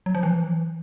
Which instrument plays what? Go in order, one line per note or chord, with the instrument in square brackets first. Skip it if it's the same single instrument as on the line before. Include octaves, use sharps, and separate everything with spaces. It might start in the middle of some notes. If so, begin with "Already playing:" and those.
[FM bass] F#3
F3
E3